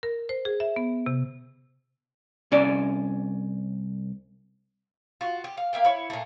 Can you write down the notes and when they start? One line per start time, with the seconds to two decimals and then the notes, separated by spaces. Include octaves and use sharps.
0.03 A#4
0.29 C5
0.45 G#4
0.60 E5
0.76 B3
1.06 C3
2.52 C2 C#4 D5
5.21 F4 F#4
5.44 G4
5.57 F5
5.73 A#3 E5 F5 G5
5.85 E4 C#5
6.10 A#2 A3